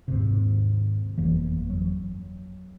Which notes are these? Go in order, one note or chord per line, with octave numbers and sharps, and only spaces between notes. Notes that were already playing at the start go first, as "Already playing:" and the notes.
D#2 G#2 C3
G1 F2 E3 A#3
F#3